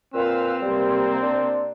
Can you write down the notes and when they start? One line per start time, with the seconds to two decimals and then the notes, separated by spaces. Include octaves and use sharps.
0.14 A#2 C4 B4 F5 E6
0.62 C3 G3 A#3
1.22 D4